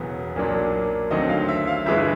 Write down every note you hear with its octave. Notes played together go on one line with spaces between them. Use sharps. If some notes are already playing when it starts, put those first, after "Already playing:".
Already playing: E1 E2 C#3 F#3 B3
B1 A#2 F#3 A#3 D4
D#2 D3 F#3 A3 C4 D#5
F5
E5
F5
G1 G2 E3 G#3 E5